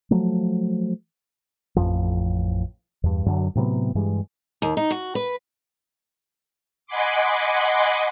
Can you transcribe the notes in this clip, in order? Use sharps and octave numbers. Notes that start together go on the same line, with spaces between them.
F3 F#3 A3
A1 F2 F3
E2 G2
F#2 D3 F#3
A2 C3 F#3 B3
G2 E3 G3 G#3
D#2
D#4
F#4
B4
D#5 F#5 G#5 B5 C6 D6